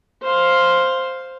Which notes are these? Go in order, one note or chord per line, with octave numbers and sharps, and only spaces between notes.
C5 F5